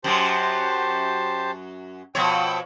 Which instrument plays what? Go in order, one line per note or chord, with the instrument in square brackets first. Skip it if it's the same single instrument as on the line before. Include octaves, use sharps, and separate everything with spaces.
[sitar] F#2 F#3 [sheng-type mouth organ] G4 C5 A5
[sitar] B2 F3 C#5 [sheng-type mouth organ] G5 E6